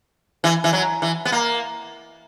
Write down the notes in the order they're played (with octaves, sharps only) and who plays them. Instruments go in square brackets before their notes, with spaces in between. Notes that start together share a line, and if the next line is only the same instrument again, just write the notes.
[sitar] E3
E3
F#3
E3
B3
A#3